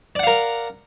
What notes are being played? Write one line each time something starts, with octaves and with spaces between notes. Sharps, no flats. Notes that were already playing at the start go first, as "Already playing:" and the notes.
A#4 D5 F5 F#5